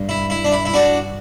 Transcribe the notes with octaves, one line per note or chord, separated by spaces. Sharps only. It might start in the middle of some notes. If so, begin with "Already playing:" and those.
Already playing: G2
E4
E4
D4
E4
E4
D4 F#4